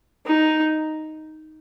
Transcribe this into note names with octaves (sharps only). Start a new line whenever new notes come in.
D#4